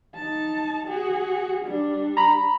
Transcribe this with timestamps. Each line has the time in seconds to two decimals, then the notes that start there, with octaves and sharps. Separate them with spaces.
0.15 D#4 A5
0.87 F#4 G#4
1.66 G3 D4
2.17 A#5 B5